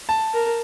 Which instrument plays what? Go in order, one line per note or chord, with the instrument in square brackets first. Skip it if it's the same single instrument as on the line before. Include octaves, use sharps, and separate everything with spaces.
[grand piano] A5
[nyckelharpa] A#4